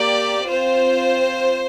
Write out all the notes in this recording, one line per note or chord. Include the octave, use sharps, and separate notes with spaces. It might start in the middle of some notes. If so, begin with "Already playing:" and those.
Already playing: A#3 G4 D5
C4 F4 C5